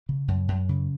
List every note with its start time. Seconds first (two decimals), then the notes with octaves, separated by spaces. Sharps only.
0.09 C#3
0.28 F#2
0.48 F#2
0.69 C#3